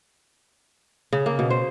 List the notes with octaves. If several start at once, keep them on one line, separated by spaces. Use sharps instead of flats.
C#3
A#3
B2
C5